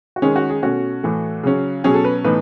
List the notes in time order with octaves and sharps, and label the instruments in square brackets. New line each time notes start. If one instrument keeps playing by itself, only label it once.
[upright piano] F#4
D#3 G#3 C#4 G#4
F#4
G#4
B2 A3 C#4 F#4
A2 E3 A3
C#3 F#3 C#4
B2 F#3 C#4 G#4
A4
B4
A2 E3 B3 D#4 B4